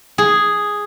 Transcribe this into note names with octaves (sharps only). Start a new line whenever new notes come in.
G#4